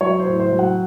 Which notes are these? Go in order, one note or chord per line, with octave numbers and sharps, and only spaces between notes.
F#3 C#5
C5
A2
C5
F#3
F#5